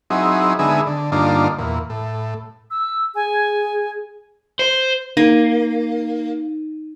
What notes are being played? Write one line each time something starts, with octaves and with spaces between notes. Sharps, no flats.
F#3 C4 D#4 E4 G#4
D3 G#3 B3 D#4 G#4 E5
D3
G2 D3 A#3 D4 D#4 F4
E2 A#2
A2
E6
G#4 G#5
C5
A#3 D#4